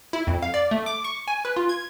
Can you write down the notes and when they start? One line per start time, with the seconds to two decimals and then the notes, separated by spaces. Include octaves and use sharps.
0.13 E4
0.27 F2
0.42 F5
0.54 D5
0.71 A3
0.86 D6
1.04 C#6
1.28 G#5
1.45 B4
1.57 F4
1.69 G#6